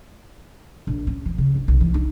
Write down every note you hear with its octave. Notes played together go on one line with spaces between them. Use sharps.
A#1
C#4
E3
C#3
C#2
B1
E3
D#4